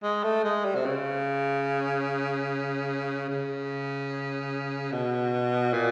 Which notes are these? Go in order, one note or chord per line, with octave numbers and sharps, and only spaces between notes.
G#3
A3
G#3
G3
C3
C#3
C#3
B2
A#2